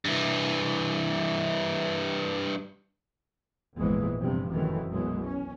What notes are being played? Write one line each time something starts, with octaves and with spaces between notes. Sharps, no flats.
G2 E3
G#1 E2 A#2 E3 F3 G#3
G2 C3 E3 F3
F1 F#2 D#3 E3 A3 C4
B1 F#2 B2 E3 F#3 G#3
C#4